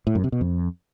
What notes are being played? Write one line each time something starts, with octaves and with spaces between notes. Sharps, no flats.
A2
F#2
C3
B2
F2